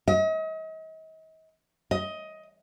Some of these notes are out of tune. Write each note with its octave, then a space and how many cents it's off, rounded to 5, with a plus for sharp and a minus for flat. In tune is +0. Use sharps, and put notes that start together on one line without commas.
D#5 +40
D#5 +15